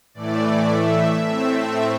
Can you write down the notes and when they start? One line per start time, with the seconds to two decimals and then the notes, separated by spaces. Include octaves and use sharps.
0.14 A2 E3 A3 D5
0.69 E5
1.25 A2 A3 C4